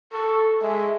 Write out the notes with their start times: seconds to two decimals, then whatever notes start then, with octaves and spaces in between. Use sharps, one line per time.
0.13 A4 C#6
0.62 G#3 E5